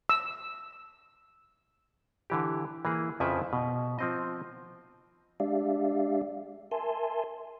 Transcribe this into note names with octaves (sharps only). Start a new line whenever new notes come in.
E6
D3 E3 G4
E3 A#3 G#4
F2 C#3 F3 E4 B4 E5
B2
F3 C4 D#5
G#3 D4 G4 D5 E5 F5
A#4 E5 G#5 A5 C6